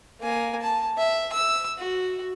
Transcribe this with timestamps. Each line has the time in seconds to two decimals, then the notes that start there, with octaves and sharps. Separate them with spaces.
0.21 A#3 G#5
0.62 A5
0.97 E5
1.33 E6
1.78 F#4